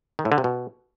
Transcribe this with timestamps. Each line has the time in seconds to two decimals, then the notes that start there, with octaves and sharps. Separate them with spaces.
0.19 D#3
0.25 A2
0.32 D3
0.38 C3
0.44 B2